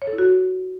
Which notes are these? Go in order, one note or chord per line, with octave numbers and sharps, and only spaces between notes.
C#5
A4
E4
F#4